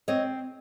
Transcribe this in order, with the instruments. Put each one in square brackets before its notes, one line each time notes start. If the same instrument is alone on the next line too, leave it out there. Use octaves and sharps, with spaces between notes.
[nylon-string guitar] C4 C#5 D#5